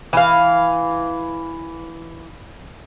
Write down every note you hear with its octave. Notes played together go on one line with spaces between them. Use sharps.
E3 F5